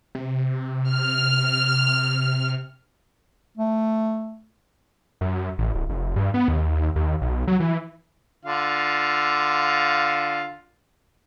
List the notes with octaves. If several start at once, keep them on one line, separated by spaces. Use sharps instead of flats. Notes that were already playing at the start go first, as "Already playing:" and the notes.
C3
F6
A3
F#2
A1
D1
F1
G2
B3
D#2
D#2
D#2
B1
F#3
E3
D3 F4 F5